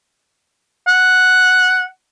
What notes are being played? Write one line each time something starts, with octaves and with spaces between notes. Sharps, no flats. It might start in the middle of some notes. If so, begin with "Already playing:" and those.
F#5